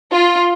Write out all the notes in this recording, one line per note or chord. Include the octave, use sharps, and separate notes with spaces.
F4